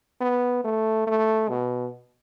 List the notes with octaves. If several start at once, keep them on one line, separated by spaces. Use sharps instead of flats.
B3
A3
A3
B2